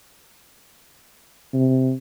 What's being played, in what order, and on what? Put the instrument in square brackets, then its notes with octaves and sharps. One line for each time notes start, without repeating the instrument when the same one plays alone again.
[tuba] C3